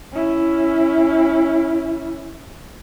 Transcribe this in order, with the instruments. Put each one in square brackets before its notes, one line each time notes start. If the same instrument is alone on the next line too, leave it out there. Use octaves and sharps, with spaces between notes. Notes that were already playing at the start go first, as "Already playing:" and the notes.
[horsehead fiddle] C#4 E4